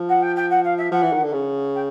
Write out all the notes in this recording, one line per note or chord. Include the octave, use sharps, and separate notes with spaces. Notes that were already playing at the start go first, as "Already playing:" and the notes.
Already playing: F3
F#5
G5
G5
F#5
F5
E5
F3 F#5
E3
D#3
D3
C#3
G5